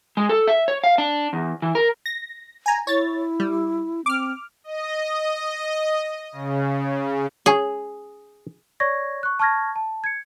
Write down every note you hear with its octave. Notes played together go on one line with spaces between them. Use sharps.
G#3
A4
E5
C#5
F5
D4
E2
E3
A#4
A#6
G#5 A#5
E4 C#5 A6
G3
C4 D6 F6
D#5
C#3
C#4 G#4 G#5
C#5 D5 C#6 G#6 A#6
C#6 F#6
A5 C#6 F6 G#6 A#6
A5
G#6 C#7